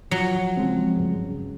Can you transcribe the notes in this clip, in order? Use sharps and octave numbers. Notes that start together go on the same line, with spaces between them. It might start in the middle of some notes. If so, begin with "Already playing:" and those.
F3 F#3
C#3 F3 G#3 C4
C#2 G2